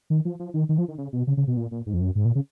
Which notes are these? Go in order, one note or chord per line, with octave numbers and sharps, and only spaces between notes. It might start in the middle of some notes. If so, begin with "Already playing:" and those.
D#3
F3
F3
D#3
D#3
F3
D#3
C#3
B2
C#3
C#3
B2
A#2
A#2
G#2
F2
F#2
G#2
A#2
C#3